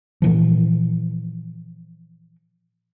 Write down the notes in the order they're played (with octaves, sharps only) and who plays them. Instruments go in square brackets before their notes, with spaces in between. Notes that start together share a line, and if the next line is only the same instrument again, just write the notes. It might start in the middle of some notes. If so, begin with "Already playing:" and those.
[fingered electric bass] A#2 E3 F3